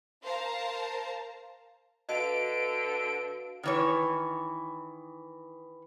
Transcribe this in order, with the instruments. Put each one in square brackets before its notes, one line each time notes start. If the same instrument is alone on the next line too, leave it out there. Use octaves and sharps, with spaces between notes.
[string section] A#4 C5 F5 A5 A#5
[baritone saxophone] D3 [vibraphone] F#4 B4 F5 [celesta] D#5 [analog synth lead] D7
[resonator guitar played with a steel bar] D#3 E3 C#5